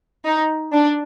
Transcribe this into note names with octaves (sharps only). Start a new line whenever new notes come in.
D#4
D4